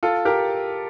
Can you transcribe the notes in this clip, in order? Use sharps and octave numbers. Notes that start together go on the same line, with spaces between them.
F4 A4
G4 A#4